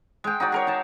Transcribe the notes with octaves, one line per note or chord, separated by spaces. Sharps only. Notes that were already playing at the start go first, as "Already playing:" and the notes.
G#3 G5
D#4 F#4 D5
G#4 A#4 C#5
D#4 A5